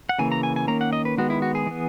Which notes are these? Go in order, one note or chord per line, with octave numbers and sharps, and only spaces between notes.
F#5
C#3 E3 A#3 G#5
A#5
G#5
G#5
D#3 A#3 C#4 A#5
F#5
D#5
B4
D#3 G#3 B3 F#4
E4
F#4
G#4
E3 B3